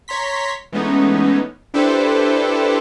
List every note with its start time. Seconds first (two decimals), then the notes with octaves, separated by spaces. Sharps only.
0.08 C#5 A#5 C6 B6
0.72 E3 G#3 A3 B3 C#4 D#4
1.74 D4 E4 G4 A4 B4 C5